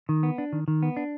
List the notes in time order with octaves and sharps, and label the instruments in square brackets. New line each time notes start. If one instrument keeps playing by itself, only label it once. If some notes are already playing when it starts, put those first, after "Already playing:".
[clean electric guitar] D#3
B3
D4
D#3
D#3
B3
D4